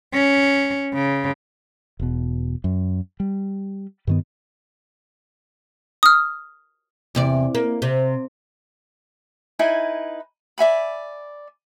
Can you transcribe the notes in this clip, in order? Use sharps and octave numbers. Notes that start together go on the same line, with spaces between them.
C#4
C#3
E1 B2
F#2
G3
G2 D#3 B3
D#6 F6
E2 C3 D5
A#3
C3
D#4 E4 B4 G#5
D5 E5 G#5 B5